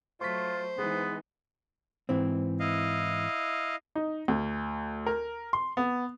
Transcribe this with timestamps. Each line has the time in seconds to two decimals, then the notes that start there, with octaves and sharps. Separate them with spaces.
0.21 F#3 A3 F4 C5 C#6 B6
0.78 E3 G#3 B3 D#4
2.09 G#2 E3 C4
2.60 E4 D#5 F5
3.95 D#4
4.28 D2
5.06 A#4
5.53 C6
5.77 B3